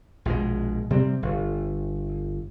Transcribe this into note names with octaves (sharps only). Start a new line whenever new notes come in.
A#1 B2 E3 G#3
C3 G3 C4
G1